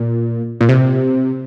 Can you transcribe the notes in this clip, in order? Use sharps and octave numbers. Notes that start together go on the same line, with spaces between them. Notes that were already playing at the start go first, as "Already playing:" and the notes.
Already playing: A#2
A#2
C3